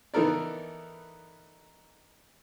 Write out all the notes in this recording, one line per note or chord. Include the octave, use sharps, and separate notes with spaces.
E3 B3 D#4 A4 A#4 D5